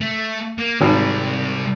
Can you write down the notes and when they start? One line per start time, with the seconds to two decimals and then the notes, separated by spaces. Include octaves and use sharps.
0.01 A3
0.58 A#3
0.81 G#1 C3 G3